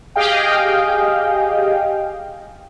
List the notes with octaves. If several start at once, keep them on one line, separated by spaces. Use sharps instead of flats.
G4 G#4 D#5 F5 G5